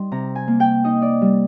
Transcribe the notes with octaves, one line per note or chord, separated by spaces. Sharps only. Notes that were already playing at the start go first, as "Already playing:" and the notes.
Already playing: G3 D#4 C6
C3 A#5
G#5
A#3
G5
D#4 D#5
D5
G3